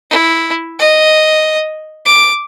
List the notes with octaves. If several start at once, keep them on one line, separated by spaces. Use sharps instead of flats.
E4
D#5
D6